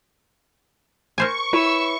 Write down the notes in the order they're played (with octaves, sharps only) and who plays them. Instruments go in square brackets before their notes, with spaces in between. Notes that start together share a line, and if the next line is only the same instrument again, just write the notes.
[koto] A#4 C5 G#5 [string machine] C#6
[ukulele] E4 B4 C#5 [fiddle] E5 E6